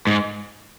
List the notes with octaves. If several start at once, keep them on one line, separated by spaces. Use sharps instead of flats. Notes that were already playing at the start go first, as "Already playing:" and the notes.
G#2